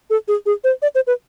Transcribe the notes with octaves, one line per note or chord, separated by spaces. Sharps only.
A4
G#4
G#4
C5
D5
C5
B4